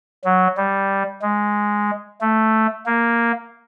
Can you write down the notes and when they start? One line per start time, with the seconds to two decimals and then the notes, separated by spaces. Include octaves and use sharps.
0.25 F#3
0.57 G3
1.22 G#3
2.21 A3
2.86 A#3